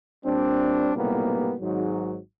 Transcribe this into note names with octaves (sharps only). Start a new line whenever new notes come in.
A#2 G3 C4 D4
B1 A2 C3 G3 A#3 B3
G#1 G#2 F#3